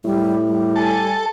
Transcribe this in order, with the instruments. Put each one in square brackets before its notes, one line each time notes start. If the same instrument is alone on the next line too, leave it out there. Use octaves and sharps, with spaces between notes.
[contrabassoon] A2 [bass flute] G3
[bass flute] G3
[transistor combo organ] A4 [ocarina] G#5